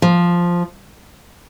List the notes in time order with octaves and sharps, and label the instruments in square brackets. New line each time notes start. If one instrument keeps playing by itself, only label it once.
[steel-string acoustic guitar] F3